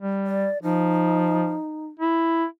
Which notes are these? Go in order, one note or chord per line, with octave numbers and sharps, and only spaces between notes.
G3
D5
F3 D#4
E4